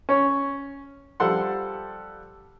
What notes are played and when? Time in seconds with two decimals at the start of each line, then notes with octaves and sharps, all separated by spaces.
0.09 C#4 C#5
1.20 F3 G3 A4 F#5 C6